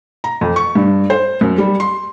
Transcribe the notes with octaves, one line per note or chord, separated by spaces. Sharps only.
A#5
F2
C#6
G2
C5
F#2
G3
C6